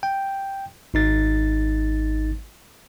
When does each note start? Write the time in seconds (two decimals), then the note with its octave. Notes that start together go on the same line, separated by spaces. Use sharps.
0.03 G5
0.94 G#1 D#4 A6